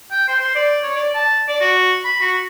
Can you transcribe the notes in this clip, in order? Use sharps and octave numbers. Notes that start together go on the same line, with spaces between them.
G5
C5
C5
D5
C#5
D5
A5
D5
F#4
B5
F#4